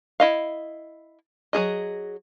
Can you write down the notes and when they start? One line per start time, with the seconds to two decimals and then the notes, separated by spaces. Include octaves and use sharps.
0.20 E4 D#5 F5
1.53 F#3 C#4 G#4 D#5